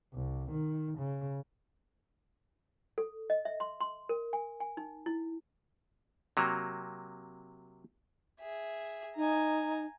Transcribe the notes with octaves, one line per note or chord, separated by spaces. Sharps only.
C2
D#3
C#3
A4
D#5
E5
C6
C6
A#4
G#5
G#5
D#4
E4
C3 F#3 A#3
G#4 E5
D#4 G#5 A#5